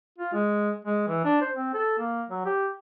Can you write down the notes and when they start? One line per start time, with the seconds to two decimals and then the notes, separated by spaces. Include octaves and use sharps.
0.18 F4
0.33 G#3
0.85 G#3
1.08 E3
1.25 D4
1.41 C5
1.56 C4
1.74 A4
1.99 A#3
2.29 F#3
2.46 G4